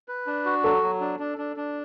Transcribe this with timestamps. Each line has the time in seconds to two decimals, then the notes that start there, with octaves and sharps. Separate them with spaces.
0.08 B4
0.27 D4
0.45 F#4
0.63 F#3 A4
0.83 F#3
1.00 D4
1.19 D4
1.38 D4
1.57 D4